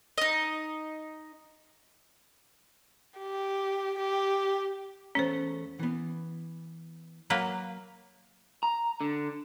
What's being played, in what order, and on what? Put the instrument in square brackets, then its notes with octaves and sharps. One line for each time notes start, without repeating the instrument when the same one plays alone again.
[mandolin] D#4 D#5
[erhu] G4
G4
[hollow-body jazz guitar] E2 A3 C#5 [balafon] C#4 C5
[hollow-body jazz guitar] E3 B3
[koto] F#3 A#3 B4
[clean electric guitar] A#5
D3